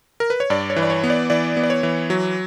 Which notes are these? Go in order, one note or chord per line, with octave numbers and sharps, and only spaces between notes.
A#4
B4
C#5
G2 D5
C#5
E3
D5
C#5
B3
D5
E3 D5
B3
D5
C#5
E3
F#3